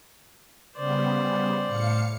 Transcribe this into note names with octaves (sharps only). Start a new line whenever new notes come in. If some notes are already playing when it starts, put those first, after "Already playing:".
C#3 G3 B3 C5 D5
A2 F5 C#7